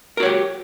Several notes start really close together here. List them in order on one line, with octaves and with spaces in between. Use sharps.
A#4 F#4 C#5 G4